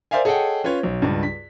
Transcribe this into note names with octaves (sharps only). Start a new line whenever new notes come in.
A#4 C5 D5 E5 F5 G#5
G#4 A4 C#5 D#5 F#5 G5
C#4 F4 B4 C#5
B1
C#2 G2
B6